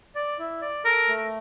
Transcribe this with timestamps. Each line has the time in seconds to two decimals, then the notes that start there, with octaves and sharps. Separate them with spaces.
0.16 D5
0.39 E4
0.62 D5
0.85 A4 A#4
1.09 A3